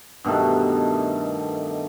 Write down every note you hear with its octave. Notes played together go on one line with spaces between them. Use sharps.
G2 B2 D#3 A3